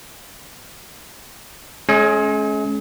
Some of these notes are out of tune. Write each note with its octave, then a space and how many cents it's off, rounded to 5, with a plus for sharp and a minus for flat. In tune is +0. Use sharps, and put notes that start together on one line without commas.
G#3 +40 C#4 +0 D#6 +45